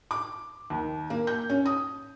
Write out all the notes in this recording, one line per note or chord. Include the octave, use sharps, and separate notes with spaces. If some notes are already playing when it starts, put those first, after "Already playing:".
D6
D#2
A#3
G6
C#4
D#6